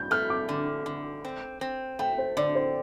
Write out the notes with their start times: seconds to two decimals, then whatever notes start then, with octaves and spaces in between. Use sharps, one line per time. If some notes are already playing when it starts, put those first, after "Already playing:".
Already playing: G2 G6
0.11 A3 F6
0.30 D6
0.49 D3
0.86 D3
1.25 C4
1.61 C4
1.99 A3 G5
2.18 C5
2.37 D3 D5
2.55 C5